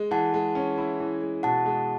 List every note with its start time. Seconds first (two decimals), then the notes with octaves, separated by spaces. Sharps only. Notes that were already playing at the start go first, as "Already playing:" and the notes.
Already playing: G#3
0.11 E3 F#5 A5
0.34 G#3
0.55 C#4
0.78 E4
1.00 E3
1.22 G#3
1.43 B2 F#5 A5
1.66 G#3